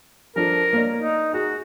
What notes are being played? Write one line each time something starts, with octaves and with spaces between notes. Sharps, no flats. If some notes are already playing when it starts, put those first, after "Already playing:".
F3 D4 A4 A#4
A#3 C#5 D5
D#4
F#4 G#4